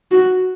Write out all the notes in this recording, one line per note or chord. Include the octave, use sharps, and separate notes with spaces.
F#4